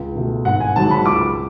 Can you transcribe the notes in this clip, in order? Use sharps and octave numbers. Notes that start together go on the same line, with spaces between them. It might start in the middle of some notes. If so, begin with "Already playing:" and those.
Already playing: C#2
B2 A3
G#1 F#5
G#5
G#2 F#3 A5
B5
C#2 D6